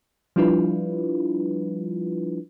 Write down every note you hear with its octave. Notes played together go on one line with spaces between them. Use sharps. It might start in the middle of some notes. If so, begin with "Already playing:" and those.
F3 G3 D4 E4 F4 B4